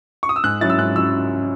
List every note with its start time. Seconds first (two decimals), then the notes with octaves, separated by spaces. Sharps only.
0.23 C#6
0.29 D#6
0.36 E6
0.44 G#2 F#6
0.61 F#3 C#4 E4 A6
0.70 E6
0.78 G#2 F#6
0.96 F#3 C#4 E4 E6